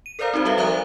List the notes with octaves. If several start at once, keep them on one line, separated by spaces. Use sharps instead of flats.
D#7
A4 A#4 C5 D5 F5 A#5
C4 D#4 F#4 C5
G3 F#4 A4 B4 E5 F5
F3 D5 E5 A#5 D#6 F#6